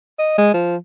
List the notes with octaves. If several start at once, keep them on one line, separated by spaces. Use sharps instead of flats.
D#5
G#3
F3